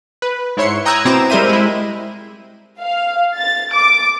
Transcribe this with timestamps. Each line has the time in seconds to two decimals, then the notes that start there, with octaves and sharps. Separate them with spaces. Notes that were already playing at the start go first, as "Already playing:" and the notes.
0.22 B4
0.57 G#2 E4 C#5 C6 C#7
0.85 G5 A#5 D#6 E6 F#6 G#6
1.05 B2 C4 E4 A#5 D6 E7
1.30 G3 G#3 A#4 C5 E5 D#7
1.49 G#3 E4
2.81 F5
3.38 A6
3.73 D6